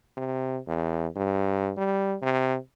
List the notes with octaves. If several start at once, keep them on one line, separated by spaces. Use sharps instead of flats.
C3
E2
G2
G3
C3